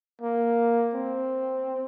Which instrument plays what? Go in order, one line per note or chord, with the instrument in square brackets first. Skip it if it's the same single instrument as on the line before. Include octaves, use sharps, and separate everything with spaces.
[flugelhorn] A#3
C4